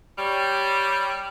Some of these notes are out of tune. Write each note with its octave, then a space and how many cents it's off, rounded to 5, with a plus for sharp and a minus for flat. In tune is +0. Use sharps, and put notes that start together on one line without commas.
G3 +0 C#5 +0